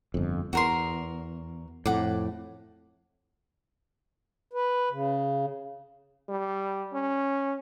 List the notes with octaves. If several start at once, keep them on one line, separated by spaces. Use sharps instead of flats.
G1 F2
E2 F#4 A#4 C6
F2 A2 F#5 D6
B4
C#3
G3
C#4